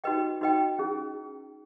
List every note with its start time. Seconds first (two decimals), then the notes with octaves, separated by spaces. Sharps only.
0.04 D#4 F#4 B4 D#5 G5
0.41 D#4 F#4 B4 D#5 G5
0.78 C#4 E4 G#4